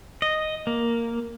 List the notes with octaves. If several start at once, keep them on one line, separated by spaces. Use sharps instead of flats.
D#5
A#3